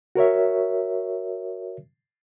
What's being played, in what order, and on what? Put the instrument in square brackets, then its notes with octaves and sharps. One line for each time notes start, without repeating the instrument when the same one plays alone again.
[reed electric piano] F#4 A#4 C#5 E5